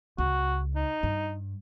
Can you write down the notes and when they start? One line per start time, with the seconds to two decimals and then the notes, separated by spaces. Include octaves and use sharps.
0.18 C#2 F#4
0.76 D#4
1.03 G2